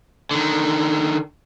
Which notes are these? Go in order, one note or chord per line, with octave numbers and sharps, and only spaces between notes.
D3 D#3